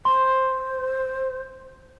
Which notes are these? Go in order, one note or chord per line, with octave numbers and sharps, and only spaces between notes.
C5 C6